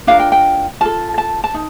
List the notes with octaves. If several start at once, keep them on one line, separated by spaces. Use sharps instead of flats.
D4 F4 A#4 F5
G5
G5
F4 A4 A5
A5
A5
D#4